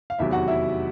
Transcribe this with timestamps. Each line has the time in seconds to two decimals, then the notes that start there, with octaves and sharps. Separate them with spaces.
0.10 F5
0.19 F1 E2 C3 D#3 F#3 E4 E5
0.33 F#4 F#5
0.48 E4 E5